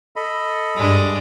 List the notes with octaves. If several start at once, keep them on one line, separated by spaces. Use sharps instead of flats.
A4 D#5 B5
G2 G#3 D4